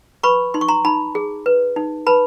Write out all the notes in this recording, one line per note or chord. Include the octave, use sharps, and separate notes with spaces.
B4 B5 C#6
D#4 C6
C#6
A#5 C6
D#4 A5 B5
G#4
B4
D#4
B4 A5 B5